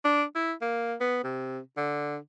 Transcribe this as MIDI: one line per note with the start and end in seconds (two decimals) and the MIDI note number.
0.05 0.23 62
0.35 0.53 64
0.62 0.94 58
1.00 1.20 59
1.24 1.59 48
1.77 2.17 50